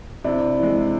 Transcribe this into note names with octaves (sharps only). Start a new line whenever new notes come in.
C3 D4 E4
E3 G#3